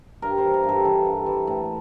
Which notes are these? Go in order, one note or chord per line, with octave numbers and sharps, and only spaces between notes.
G2 A#4
C5
E3
A#4
G2
A4
E3 A4
G2
E3
A2